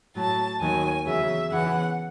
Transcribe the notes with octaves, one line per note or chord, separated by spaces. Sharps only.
A2 F#3 A5
D#2 D#3 F#3 G#5
E2 C#3 F#3 E5
E2 C#3 E3 F#5